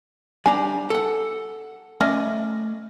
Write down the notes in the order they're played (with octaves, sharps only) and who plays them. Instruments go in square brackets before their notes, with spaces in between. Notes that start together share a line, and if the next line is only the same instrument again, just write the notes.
[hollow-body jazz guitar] G3 D4 A#5 [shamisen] G#5
[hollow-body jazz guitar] A4 F#5
[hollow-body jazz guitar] A3 D5 D#5 [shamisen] C#4